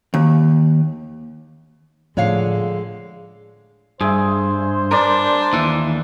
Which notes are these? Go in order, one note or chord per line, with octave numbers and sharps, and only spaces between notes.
D#2
A2 D3 F3 G#3 C#5 F5
G2 G#4 C5 E5
D4 A#4 B4 D5
D#2 E3 E5